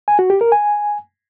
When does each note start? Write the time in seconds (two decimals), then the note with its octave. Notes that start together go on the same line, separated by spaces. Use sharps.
0.08 G#5
0.19 F#4
0.30 G4
0.41 A#4
0.52 G#5